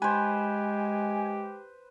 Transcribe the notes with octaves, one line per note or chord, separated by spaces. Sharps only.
G#3 G4 B4 C5 G#5